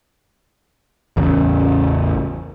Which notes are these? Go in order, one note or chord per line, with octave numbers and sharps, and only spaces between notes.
A1 E2 C#3